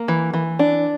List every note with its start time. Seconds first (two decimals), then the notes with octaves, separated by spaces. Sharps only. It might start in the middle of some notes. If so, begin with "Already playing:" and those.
Already playing: A#3 A#4
0.08 E3
0.34 E3
0.59 D4